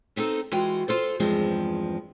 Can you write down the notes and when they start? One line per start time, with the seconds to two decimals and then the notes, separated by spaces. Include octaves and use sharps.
0.16 B3 C4 D#4 G4 A4
0.52 E3 G#3 F4 F#4 F#5 G5
0.88 F4 A4 C5
1.20 E2 G2 F3 G#3 C4